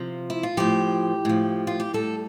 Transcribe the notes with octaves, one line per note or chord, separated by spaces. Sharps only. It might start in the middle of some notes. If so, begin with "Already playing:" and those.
Already playing: C3 F3 F4
E4
F4
A2 F3 G4
A2 F3
F4
G4
A2 G3 A4